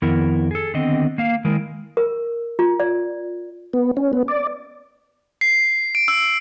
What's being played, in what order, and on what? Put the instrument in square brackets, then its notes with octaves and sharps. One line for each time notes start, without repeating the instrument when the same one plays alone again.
[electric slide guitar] F2 D#3 B3 E4 A#4
G#4 A4
D3 D#3 B3 C4 D#5
A#3 F5
D#3 G#3 E4 A#4
[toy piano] A#4
F4
D5
[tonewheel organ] B3
C#4
B3
D5
[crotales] C7
D7
E6